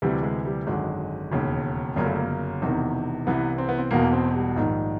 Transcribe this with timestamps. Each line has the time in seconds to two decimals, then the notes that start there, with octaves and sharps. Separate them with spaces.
0.02 D2 C3 E3 G3
0.23 G#3
0.45 G3
0.67 G#1 F#2 D3 G#3
1.32 E1 D#2 C#3
1.96 G1 F#2 C#3 A#3
2.06 A3
2.15 A#3
2.62 E1 E2 C3 D#3
3.27 C2 C3 E3 B3
3.58 C4
3.69 B3
3.78 C4
3.91 E1 E2 B2 A#3
4.13 C4
4.35 G3
4.56 A#1 G#2 D#3